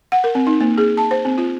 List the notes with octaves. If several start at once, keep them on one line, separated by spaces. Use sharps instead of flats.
F#5
A#4
C4
D#4
A#3
G#4
A5
C5
C4
F4